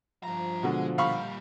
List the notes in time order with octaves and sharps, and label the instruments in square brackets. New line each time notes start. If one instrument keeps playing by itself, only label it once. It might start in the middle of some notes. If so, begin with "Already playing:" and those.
[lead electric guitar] G2 A#5 [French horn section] F3
[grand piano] B2 D3 [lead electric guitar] G#3
[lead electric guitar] A#2 G3 [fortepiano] F5 B5 C#6